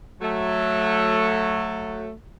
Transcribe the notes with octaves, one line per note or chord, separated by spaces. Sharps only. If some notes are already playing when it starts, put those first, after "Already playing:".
F#3 A3